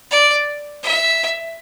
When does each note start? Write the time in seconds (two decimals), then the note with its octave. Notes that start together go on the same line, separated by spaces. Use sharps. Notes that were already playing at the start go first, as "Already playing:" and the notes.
0.11 D5
0.83 E5